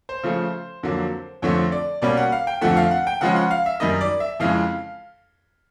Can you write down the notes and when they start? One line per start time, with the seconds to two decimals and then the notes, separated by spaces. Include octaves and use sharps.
0.09 C5
0.23 C#3 F3 A3
0.83 F2 D3 F#3 A#3
1.42 F2 D3 F3 A3 C4 C#5
1.72 D5
2.02 B2 G3 A#3 C#4 D5
2.17 F#5
2.32 F5
2.47 G5
2.61 F2 D3 F3 A3 F#5
2.77 F5
2.91 F#5
3.07 G5
3.21 C#3 F3 G#3 C#4 F#5
3.36 F#5
3.51 F5
3.66 E5
3.80 F#2 D#3 G3 D#5
4.01 D5
4.20 E5
4.40 F2 C#3 E3 G#3 F5